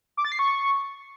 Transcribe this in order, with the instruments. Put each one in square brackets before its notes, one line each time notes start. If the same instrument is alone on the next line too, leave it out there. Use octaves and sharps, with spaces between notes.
[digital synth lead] D6
A6
C7
C#6